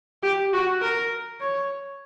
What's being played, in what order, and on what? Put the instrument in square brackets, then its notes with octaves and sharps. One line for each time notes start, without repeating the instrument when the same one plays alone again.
[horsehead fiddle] G4
F#4
A#4
C#5